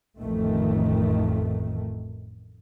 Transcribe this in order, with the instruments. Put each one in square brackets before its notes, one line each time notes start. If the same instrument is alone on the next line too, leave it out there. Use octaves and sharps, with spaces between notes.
[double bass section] A1 F2 D#3 A3